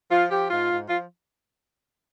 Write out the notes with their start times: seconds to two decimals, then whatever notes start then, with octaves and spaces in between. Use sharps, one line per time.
0.10 F3 F4
0.30 F3 G4
0.50 G#2 F4
0.69 G#2
0.89 F3 F4